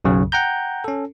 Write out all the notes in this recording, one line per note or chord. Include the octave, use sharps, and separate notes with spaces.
B1 F#2 C#3 F#3
F#5 G5 A#5 G6
C#4 A4